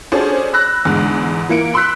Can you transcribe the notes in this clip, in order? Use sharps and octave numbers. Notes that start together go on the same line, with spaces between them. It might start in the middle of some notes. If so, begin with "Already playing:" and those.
C#4 D4 F#4 G#4 A4 C5
B5 E6 F#6 A#6
E2 G#2 D3 G#3
E3 A#3 C#7 D7
B5 C6 E6 F#6 B6